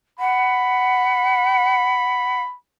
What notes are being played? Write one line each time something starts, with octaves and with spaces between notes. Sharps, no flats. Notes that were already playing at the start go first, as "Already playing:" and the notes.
F#5 B5